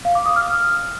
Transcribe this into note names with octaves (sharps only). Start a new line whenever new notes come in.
F5
D6
D#6
F6
F6